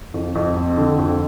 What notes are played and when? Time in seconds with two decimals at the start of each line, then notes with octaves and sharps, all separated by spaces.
0.14 F2
0.35 F2
0.57 C4
0.77 D3
0.99 F2